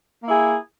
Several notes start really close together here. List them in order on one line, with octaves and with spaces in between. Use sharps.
A#3 E4 G#4